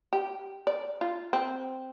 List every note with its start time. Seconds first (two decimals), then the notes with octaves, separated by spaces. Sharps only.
0.13 G4
0.67 D5
1.01 F4
1.33 C4